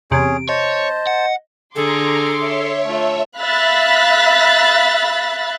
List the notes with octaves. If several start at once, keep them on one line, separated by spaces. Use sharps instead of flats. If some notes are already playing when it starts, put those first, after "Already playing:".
E2 C3 C#4 G#4 D7
C5 C#5 D#5 A5
F#5
D3 G#4 A4 A#5 C6 D6
C#5 E5
A3 F4
E5 F5 B5 F#6 A6 B6